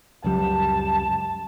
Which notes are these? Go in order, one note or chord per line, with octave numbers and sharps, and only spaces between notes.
C#2 F#2 G3 A5